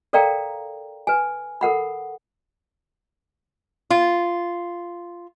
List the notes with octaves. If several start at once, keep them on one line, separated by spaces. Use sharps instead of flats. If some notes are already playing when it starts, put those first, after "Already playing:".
A4 A#4 D5 F5 G5 A#5
B4 G#5
A4 A#4 F#5 B5
F4